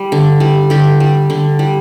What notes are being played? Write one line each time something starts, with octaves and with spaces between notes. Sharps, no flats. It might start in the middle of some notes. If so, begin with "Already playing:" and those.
Already playing: G3
D3
G3
D3 G4
G3
D3
G3